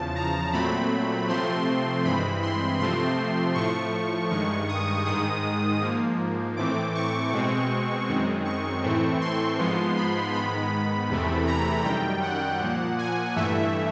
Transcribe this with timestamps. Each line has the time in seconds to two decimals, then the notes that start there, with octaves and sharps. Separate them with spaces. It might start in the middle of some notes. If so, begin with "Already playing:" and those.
Already playing: E2 C#3 F3 A5
0.16 A#5
0.53 A#2 F#3 A3 C4 B5
1.28 C3 F3 A3 C4 C6
2.04 G2 E3 G#3 C4 B5
2.42 C6
2.79 C3 F3 A3 C4 C6
3.55 A2 F3 A3 C#6
4.30 G2 D#3 G#3 C#6
4.69 D#6
5.05 G#2 D#3 G#3 D#6
5.81 G#2 F3 A#3
6.57 A2 E3 A3 C4 D6
6.95 C#6
7.32 B2 G#3 C4
8.07 F#2 D#3 G#3 C4
8.45 C#6
8.83 A2 E3 A3 C4
9.21 C6
9.59 G#2 F3 G#3 B3
9.97 B5
10.33 G#2 D#3 G#3 B3 B5
11.09 E2 C3 E3 A3
11.47 A#5
11.85 F#2 D#3 G3 G5
12.22 F#5
12.60 A#2 F3 A#3
12.98 G#5
13.36 G2 E3 A3 E5